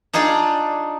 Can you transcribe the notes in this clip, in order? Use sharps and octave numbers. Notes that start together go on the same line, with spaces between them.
D4 D#4 F4 G#4 D5